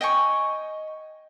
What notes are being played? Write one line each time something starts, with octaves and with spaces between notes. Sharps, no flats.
D#5 G5 G#5 C#6